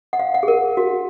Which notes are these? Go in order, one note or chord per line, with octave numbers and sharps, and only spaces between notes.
F#5
F5
F#5
G#4
A#4
F#4